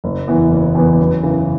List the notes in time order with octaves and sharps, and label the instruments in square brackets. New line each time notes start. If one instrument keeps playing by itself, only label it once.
[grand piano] F#1
E2 E3 B3
F#1
E2 E3 B3
F#2
C#3 E3